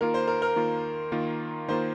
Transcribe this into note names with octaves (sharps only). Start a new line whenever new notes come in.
D#3 A#3 F4 A#4
C5
A#4
A#4
D#3 A#3 F4
D#3 A#3 F4
D#3 A#3 F4 C5